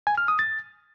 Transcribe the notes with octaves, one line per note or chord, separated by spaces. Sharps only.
G#5
F6
D#6
A6